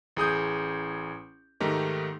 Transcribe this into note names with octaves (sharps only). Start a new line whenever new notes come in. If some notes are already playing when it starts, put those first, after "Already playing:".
A1 G#4 D#6 G6
G#2 D#3 A3 D#4 G4